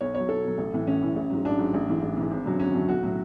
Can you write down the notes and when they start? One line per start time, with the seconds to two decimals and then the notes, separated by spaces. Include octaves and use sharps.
0.01 B1 C#5
0.15 B2 F#3 C#5
0.29 B1 A4
0.44 B2 F#3
0.58 A1
0.73 A2 E3
0.87 A1 C#4
1.02 A2 E3
1.15 A1
1.30 G#2 F#3
1.45 A1 D4
1.58 G#2 F#3
1.74 A1
1.88 G#2 E3
2.02 A1
2.17 G#2 E3
2.30 G#1
2.45 F#2 D3 F#3
2.60 G#1 C#4
2.74 F#2 D3 F#3
2.88 B1 F#4
3.03 A2 F#3